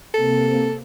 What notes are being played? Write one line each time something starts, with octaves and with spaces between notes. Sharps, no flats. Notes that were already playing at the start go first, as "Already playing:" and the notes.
C3 A#3 C4 A4